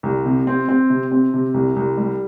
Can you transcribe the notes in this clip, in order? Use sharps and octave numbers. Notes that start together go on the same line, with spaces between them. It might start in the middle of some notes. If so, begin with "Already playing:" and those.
C2
C3
C4
C4
C3
C4
C3
C2
C2
G3